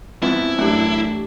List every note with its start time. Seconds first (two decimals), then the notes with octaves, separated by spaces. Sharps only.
0.23 G#2 F3 B3 C4 E4
0.58 F#2 E3 A3 D4 G4